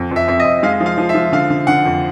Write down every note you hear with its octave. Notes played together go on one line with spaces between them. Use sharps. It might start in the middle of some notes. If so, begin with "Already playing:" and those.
Already playing: F2
F2 E5
F2 E5
D#5
F2
G#3 F5
F3
F5
F3
E5
F3
D3 F5
D3
D3 F#5
F2